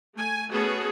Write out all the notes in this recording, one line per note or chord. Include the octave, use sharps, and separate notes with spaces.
A3 G#5
A3 B3 C#4 F#4 G#4 A4